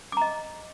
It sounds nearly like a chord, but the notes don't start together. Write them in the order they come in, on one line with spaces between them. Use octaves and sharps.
D6 A#5 D#5